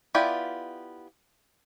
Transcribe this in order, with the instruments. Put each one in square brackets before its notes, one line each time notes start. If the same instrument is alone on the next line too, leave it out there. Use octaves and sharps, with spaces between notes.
[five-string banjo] B3 E4 F4 G4 D5